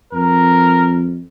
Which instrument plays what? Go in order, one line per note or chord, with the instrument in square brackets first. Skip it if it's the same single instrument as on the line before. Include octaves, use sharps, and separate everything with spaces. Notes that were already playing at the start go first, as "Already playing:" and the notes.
[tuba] F2 [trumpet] A#4